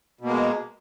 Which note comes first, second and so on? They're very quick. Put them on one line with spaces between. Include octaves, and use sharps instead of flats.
B2 A#3 G#3